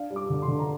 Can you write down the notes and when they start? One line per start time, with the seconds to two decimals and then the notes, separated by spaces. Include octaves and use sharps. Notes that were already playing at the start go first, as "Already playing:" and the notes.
Already playing: D4 F5
0.11 G3
0.16 D6
0.30 D3
0.42 C6
0.48 D3
0.59 A#5